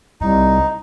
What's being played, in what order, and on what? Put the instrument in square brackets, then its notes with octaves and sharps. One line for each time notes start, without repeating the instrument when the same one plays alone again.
[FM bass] C2 [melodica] D#4